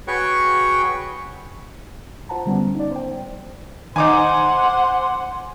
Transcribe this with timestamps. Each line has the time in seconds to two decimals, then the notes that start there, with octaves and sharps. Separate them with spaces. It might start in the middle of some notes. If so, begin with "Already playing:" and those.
0.07 F#4 G#4 B4 C#5 G5 C#6
2.29 F4 C5 F#5 A5 A#5
2.46 D3 G3 B3 C#4
2.75 D#4 D5
2.91 C5 G5
3.96 D#3 D#4 C5 F#5 G#5 D6